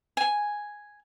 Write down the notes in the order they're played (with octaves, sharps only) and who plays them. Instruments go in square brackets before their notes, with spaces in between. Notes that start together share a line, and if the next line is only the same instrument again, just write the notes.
[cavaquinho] G#5